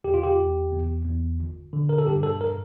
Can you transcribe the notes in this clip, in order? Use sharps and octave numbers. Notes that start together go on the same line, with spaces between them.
E2 G4
F4
G4
E2
E2
E2
G1
D3
A#4
A4
G2 G4
A4
A#4